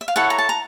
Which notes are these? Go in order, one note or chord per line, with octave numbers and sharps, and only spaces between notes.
E5
F5
E4 A4 C#5 F#5
A#5
A5
A#5